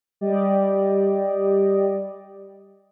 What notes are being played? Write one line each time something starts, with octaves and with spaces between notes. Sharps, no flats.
G3 G4 D5 D#5